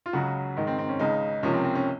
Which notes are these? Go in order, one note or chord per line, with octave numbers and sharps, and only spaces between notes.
F4
C#2 C#3 F#3 F#4
G#2 D#3 G#3
C4
C4
C#4
C#2 C#3 G#3 D#4
C#2 C3 F3 A#3 C#4
C4
C4
C#4